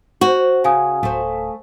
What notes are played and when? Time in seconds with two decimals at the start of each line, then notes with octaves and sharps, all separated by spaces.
0.21 F#4 C5
0.64 C#3 F5 G#5 D#6
1.03 D1 A3 C5